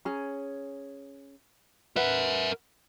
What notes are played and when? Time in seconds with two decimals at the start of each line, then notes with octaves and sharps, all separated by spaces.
0.05 C#4 G#4 A#5
1.96 A#4 B4 E5 F#5